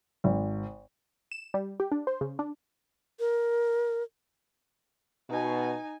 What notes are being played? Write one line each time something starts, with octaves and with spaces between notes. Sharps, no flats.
G#1
E7
G3
G4
D4
C5
C#3
D4
A#4
B2 D#4 G#5